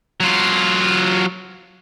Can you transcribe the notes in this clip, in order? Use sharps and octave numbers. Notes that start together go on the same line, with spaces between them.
F#3 F4